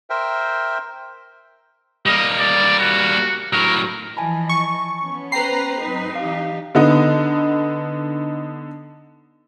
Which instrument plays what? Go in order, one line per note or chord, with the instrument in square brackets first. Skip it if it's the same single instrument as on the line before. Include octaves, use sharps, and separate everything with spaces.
[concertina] A#4 C5 E5 G5
[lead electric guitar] G3 A#3 [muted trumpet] D#5
[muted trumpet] D5
F#4
[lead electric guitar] A2 F#3 [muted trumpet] A#4
[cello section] E3 F3 D#5 [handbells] G#5 A5 B5
[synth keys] C#6
[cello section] B3 C#4
[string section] B4 C5 A#5 [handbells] G5 B5 [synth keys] C7
[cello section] F#3 C4 B4 [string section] D#4
[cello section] E3 G4 [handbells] F5
[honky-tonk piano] D3 B3 D#4